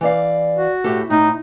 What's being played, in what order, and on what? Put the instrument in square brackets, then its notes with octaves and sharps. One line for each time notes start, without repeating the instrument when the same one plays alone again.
[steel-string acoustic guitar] E3 D5 F5
[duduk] F#4
[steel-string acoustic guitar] A2 G4 A4
[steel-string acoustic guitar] A2 [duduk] D#4